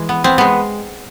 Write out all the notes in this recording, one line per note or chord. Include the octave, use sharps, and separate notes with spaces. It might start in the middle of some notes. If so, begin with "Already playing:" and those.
Already playing: E3 G#3
B3
B3 C4
G#3 B3